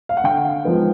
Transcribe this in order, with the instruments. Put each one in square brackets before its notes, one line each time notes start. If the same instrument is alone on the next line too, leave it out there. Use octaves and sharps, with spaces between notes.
[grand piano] F5
F#5
D3 F5 G5
F3 G#3 B3 D#4